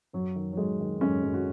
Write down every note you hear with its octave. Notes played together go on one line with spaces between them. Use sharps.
F#2 F#3
D#3
F#3
D#3 G#3
D#3
F#2 G#3 C#4
F#2
F#4